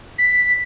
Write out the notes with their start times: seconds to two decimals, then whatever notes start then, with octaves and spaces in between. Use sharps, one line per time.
0.18 B6